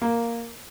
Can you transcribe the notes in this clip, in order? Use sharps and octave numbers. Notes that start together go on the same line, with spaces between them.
A#3